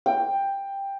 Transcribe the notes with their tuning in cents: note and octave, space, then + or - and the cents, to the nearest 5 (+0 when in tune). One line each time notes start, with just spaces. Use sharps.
G5 +10